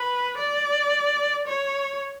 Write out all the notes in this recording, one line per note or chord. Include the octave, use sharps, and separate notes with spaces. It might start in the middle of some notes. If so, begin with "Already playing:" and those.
Already playing: B4
D5
C#5